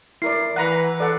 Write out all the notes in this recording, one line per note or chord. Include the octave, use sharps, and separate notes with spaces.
E4 A#4 D5 C7
E3 F#5 A#5 B5 F#6
A4 D5 F#5